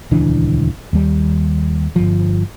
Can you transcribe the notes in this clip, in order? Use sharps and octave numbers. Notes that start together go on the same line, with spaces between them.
D#1 C#2 E3 D4
D#2 G3
G1 F3